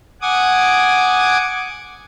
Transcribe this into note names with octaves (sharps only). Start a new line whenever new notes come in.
F#5 G#5 D6 D#6 G#6